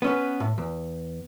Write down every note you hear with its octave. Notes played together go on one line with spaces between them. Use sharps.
B3 C#4 B4
A2
E2